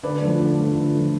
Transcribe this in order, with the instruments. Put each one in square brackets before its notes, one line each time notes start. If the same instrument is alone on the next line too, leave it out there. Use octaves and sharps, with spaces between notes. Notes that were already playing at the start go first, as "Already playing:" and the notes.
[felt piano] D3 B4 D5
F3 A3
D3
F3 A3
D3
F3 A3